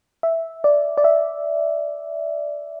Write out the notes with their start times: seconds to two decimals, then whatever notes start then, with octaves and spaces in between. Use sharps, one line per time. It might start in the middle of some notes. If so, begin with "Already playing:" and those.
0.23 E5
0.64 D5
0.97 D5
1.04 E5